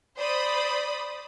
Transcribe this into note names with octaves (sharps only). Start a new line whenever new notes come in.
C5 D5 B5 D#6